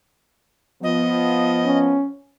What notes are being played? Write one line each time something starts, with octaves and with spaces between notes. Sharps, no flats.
F3 B3 D#5
C#4